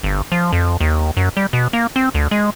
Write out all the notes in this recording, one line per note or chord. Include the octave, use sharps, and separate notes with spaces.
G1
F3
F2
D#2
F#2
G3
B2
A#3
C4
D2
G#3